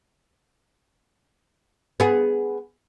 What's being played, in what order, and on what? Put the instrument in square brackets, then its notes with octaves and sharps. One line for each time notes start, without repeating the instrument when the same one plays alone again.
[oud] B3 G#4